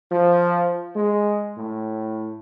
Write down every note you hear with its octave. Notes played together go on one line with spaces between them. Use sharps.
F3
G#3
A2